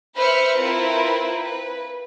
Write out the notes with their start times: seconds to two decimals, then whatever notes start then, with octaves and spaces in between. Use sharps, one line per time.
0.16 B4 C5 E5 B5 F6 C#7
0.59 C4 E4 F4 A#4 B4
1.39 B4